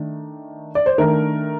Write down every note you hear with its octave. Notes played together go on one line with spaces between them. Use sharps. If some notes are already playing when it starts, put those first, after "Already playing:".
Already playing: D#3 A3 D4
D5
C5
D#3 A3 D4 A#4